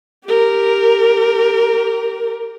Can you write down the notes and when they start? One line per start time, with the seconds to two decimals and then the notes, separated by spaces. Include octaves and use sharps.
0.25 G4 A#4